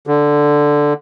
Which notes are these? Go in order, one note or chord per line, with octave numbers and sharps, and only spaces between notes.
D3